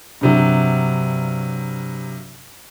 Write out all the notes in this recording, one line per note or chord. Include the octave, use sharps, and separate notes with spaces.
G2 C3 F#3